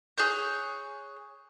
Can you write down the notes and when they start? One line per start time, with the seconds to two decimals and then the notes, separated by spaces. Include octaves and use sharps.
0.18 G#4 C#5 F#6 G6